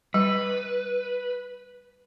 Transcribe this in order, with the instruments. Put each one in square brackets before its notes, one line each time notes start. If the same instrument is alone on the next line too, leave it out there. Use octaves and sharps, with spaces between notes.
[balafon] G3 [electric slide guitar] B4